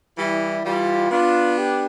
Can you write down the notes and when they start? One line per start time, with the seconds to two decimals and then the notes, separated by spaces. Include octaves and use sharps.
0.17 E3 G3 E4
0.64 E3 G3 F4
1.11 B3 D4 F4
1.58 G4